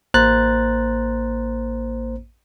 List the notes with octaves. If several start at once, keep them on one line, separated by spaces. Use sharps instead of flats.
A1 A#3 C5 A#5 F#6 A6